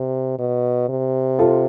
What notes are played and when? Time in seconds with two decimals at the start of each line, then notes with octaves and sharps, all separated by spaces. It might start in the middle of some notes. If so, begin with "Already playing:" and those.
Already playing: C3
0.39 B2
0.89 C3
1.39 F4 A4